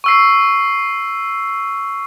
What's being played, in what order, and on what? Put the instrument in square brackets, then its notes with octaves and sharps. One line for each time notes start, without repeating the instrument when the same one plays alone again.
[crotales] C#6 E6 C7